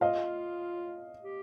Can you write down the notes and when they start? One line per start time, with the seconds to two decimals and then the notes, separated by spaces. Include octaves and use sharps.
0.01 F4 D#5 F5
1.23 G4